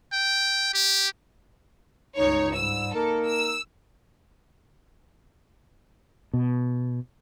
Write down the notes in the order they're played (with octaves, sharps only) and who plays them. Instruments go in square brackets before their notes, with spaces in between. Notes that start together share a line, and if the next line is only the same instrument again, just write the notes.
[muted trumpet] G5
G4
[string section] C#2 G2 C#5 [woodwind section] D#4
[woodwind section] G#2 G3 [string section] E6
[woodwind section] A#3 D#4 A#4 [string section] A4
[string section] E6
[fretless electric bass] B2